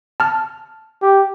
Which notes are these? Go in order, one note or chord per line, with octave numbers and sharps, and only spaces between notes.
A5 F6
G4